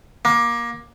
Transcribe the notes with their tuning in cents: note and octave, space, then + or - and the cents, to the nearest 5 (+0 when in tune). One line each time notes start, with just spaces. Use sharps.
A#3 +20